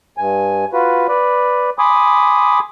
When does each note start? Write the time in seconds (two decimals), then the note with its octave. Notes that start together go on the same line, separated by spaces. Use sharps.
0.18 G2 G#5
0.73 F4 F#4 B4
1.08 B4 D5
1.79 G#5 B5 C6 D6 D#6